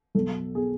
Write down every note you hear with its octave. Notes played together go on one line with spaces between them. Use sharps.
B1 B2 A4
B2 G#4